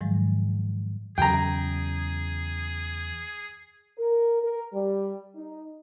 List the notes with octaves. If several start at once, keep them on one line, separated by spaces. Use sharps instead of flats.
G#2 D#3 F3 F#3 G#3
E2 C#3 F#3 G#4 G5 A#5
A#4
A#4
G3
D#4